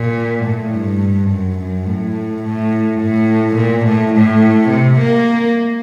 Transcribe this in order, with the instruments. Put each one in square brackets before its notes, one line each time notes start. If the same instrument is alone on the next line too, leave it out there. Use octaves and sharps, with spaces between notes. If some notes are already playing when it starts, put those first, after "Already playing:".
Already playing: [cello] A#2
A2
G2
F#2
F#2
A2
A2
A2
A#2
A2
A2
C3
A#3